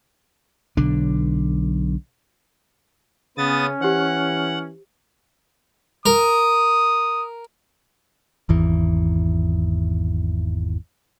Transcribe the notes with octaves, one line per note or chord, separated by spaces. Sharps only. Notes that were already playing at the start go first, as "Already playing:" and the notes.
B1 D3 D4
C#3 B3 C#4 D#6 A6
E3 G4 C5 F#5
A#4 D#6
G#1 E2 E3